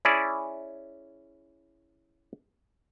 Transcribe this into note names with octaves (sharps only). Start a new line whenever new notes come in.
C#4 E4 G#4 D5